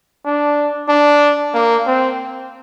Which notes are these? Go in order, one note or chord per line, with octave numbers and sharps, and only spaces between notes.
D4
D4
A#3
C4